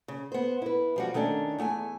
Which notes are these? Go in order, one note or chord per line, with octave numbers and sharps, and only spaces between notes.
C#3
B3 C5
E4 B4
F3 G3 F#4
D#3 A3 C#4 D4
E2 A3 G5 G#5